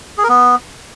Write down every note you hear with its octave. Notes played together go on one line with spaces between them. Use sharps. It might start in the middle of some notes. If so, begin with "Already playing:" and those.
G#4
A#4
B3